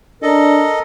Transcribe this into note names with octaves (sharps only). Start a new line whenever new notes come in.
D4 A4 A#4 D#5